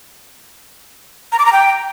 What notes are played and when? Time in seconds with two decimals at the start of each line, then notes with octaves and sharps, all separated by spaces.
1.32 A#5
1.39 D6
1.46 A#5
1.53 G5